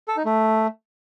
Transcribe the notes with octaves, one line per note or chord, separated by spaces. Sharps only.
A4
D#4
A3